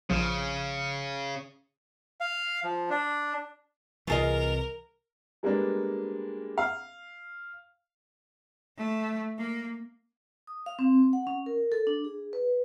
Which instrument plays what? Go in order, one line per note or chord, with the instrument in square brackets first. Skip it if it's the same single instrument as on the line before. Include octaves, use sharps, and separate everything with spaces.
[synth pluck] A#1 F3 [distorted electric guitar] C#3
[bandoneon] F5
F3
D4
[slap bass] C2 E3 [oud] F4 G#4 D#5 [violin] A#4
[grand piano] G3 G#3 A#3 B3 D4
F5
[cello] A3
A#3
[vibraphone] D#6
F5
C4
F#5
C#4
A#4
A4
D4
G#4
B4